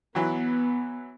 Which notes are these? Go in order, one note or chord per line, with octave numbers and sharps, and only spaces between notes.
E3 F#3 B3